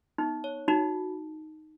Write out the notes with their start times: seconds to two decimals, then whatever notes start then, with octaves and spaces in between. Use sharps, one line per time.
0.18 B3 D#4
0.44 C#5
0.68 D#4 F#4